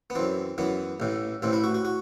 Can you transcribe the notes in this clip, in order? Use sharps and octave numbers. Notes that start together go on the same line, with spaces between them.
B3
F#2 E3 C4
F#2 E3 B3
A1 A2 E3
A1 A2 E3 C4
E4
F#4
F#4
F#4